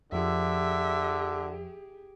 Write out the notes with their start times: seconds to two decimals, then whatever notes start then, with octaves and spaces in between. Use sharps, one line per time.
0.12 F2 D3 F3 G4 G#4 E5